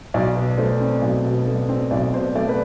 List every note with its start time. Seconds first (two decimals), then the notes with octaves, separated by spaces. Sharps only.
0.14 B1 D5
0.35 B2
0.58 A3 C5
0.81 C4
1.02 B1
1.25 B2
1.47 A3
1.69 C4
1.91 B1 D5
2.13 B2 C5
2.35 A3 D5
2.49 B4